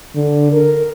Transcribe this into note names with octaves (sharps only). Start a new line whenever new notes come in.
D3
A#4